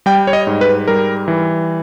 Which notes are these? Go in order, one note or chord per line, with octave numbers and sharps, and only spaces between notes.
G3 G5
C#5
D#5
G#2
B4
G3 A#4
E3